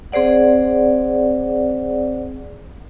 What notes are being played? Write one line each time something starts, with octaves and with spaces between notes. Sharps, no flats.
C4 G#4 C5 D5 F#5